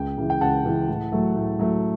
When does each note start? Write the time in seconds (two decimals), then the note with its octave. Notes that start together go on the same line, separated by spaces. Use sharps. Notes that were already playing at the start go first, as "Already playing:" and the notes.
Already playing: C#2 G5
0.18 C#3 E3
0.30 G5
0.41 C#2 F#5 A5
0.65 C#3 E3
0.88 A2
1.12 F#3 A3
1.36 A2
1.59 F#3 A3